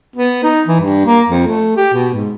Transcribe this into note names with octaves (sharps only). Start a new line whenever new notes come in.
B3
D#4
E3
G2
A#3
F2
A3
G4
B2
G#2